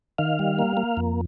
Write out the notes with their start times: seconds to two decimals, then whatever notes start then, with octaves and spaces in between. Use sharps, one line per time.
0.18 D#3 F5
0.39 G3
0.59 A#3
0.77 A#3
0.97 F2